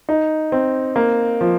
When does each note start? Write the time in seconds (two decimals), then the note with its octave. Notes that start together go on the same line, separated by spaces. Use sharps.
0.09 D#4
0.52 C4
0.96 A#3
1.41 F3